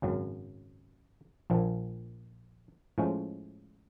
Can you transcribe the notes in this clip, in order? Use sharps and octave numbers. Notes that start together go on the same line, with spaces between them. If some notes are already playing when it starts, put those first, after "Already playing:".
G#1 F#2 C#3 F#3
A#1 A#2 F3
A2 F3 G#3 C#4